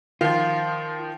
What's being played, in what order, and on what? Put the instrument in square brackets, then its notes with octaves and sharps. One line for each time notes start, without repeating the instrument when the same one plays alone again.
[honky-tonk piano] D#3 F3 [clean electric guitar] F4